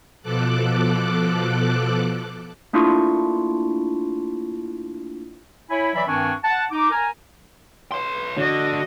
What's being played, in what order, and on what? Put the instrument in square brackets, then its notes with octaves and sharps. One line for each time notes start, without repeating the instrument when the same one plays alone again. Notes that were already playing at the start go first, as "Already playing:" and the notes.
[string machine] B2 F3 A4 D6 F#6
[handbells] A3 A#3 D4 E4 F4 C#6
[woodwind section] E4 C#5 G#5 B5
E3 F#3 D5 E5 B5
G2 D#3 C4 D4 G#5 C#6
F#5 A5
D#4 D6
A#4 G#5 A#5
[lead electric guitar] C#5 C6
[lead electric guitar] D3 [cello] F#4 D#5